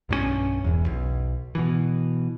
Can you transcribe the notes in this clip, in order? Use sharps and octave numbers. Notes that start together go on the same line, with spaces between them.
B1 G2 E3 C#4
E1 E2
B1
B2 E3